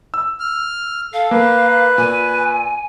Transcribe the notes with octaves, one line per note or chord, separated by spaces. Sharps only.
E6
F6
A4 F5
A#3 B4
A#2 G#5